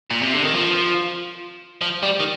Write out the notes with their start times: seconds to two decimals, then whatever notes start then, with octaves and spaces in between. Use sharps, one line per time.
0.10 A#2
0.22 C3
0.34 D3
0.45 D#3
0.55 F3
1.81 F3
2.03 G3
2.20 D#3